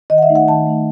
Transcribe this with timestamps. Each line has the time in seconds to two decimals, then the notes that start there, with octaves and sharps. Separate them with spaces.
0.10 D#3 D#5
0.18 F#5
0.22 E5
0.29 A3 D#4
0.35 F#5
0.48 D#3 A5
0.67 A3 D#4